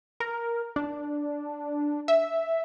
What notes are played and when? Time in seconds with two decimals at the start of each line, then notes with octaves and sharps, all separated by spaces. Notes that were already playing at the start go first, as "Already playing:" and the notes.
0.20 A#4
0.76 D4
2.08 E5